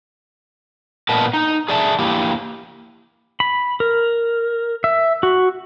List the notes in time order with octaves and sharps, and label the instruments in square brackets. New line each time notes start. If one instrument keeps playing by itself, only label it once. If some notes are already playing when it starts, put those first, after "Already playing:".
[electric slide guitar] A#2 B3 A#4 B4 D#5 A5
D#4
G#4 D5 E5 A5
A#3 E4 G4
[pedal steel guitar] B5
A#4
E5
F#4